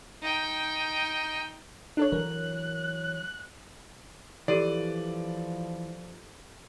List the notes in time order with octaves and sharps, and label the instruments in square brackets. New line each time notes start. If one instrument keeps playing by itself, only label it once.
[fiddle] D#4 G5
[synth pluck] D4 A4 C#5 [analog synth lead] F#6
[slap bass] E3 F#3 [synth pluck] A#4
[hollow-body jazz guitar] E3 [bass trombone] F3 [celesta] G4 A4 D#7 [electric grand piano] D5